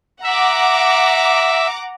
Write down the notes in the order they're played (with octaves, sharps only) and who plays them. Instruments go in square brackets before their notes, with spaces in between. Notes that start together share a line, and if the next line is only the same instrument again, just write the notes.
[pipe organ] E5 [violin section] F#5 A#5 D6